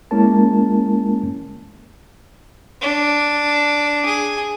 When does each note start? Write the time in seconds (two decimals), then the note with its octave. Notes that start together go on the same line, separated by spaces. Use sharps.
0.11 G#3 A#3 C#4 E4 A#4 A5
2.81 D4
4.06 G#4